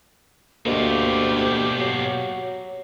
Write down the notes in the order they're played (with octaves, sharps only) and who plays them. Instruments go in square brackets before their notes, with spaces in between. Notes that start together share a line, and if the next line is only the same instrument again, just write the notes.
[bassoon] D2 [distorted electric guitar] B2 F4 [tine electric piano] A#3 D#5 [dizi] G4
[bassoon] F#3 [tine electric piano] C7